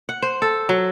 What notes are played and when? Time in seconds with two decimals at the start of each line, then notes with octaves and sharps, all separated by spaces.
0.09 F#5
0.22 C5
0.42 A4
0.69 F#3